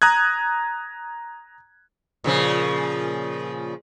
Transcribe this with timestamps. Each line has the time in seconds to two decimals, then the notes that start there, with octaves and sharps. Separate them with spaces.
0.02 A#5 D#6 F#6 G#6
2.24 A#2 C#3 F3